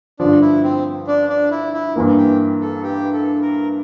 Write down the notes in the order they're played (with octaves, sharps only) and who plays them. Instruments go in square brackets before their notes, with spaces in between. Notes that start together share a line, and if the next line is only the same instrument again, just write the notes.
[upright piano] G2 D3 F3 [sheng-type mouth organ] D4
[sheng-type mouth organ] E4
C4
D4
D4
E4
E4
[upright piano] G2 E3 A#3
[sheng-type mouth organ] G4
A4
G4
A4
A#4